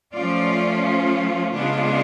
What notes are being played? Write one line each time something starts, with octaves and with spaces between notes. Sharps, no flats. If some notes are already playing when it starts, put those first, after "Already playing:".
F3 A3 C#4 F4 D5
C#3 G#3 B3 D4 F4